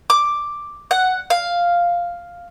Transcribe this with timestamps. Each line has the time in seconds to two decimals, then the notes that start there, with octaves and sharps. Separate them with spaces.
0.10 D6
0.91 F#5
1.30 F5